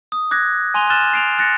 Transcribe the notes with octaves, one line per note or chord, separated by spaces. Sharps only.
D#6
D6 F#6 G#6 A#6
G#5 C6 D#7 F7 G7
F6 F#6 A6 E7 G7
C7 D7 F7
F#6 A6 A#6 C#7